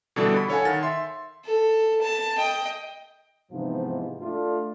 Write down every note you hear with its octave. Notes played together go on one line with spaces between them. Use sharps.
B2 D3 E3 G3 D4 A4
B5
A4 C#5 F5 F#5 G#5
D#3 A6
E5 C6
A4
A5
D#5 G5
G#2 C3 E3 F3 B3 D#4
A3 D4 F4